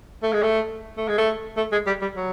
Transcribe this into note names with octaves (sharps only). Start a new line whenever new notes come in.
A3
G#3
A3
A3
G#3
A3
A3
G#3
G3
G3
F#3